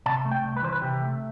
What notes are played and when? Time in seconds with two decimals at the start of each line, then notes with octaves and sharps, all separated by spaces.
0.06 C3 A5
0.25 A3
0.31 G5
0.45 C2
0.57 B4
0.63 E3 C5
0.73 B4
0.82 C3 G4
1.01 A3